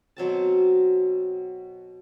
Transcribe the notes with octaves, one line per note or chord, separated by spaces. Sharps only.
B2 F#3 C4 A5